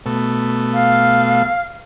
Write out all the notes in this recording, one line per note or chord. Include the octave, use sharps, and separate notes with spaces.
B2 A3
F5